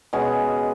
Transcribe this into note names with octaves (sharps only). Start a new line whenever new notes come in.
B2 G#3 C#4 G#4